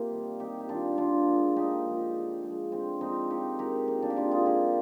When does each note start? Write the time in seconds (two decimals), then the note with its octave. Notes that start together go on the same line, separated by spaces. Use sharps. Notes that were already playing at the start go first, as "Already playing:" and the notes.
Already playing: C3 A#3 F4 G4 A#4
0.11 D#3 G3
0.40 C3 D#4 G4
0.61 G4
0.69 D#3 G3 D4 F4
0.97 A#2 D4 F4
1.27 F3 G#3
1.56 A#2 D#4 G4
1.85 F3 G#3
2.14 D3
2.43 F3 G#3
2.72 D3 C4
3.01 F3 G#3 C4 D#4
3.30 A#2 D#4 G4
3.59 G#3 G4 A#4
3.87 A#2 G4 A#4
4.02 A#3 D4
4.10 G4
4.16 G#3 D4 F4
4.31 F4 G#4
4.46 D3 G4 A#4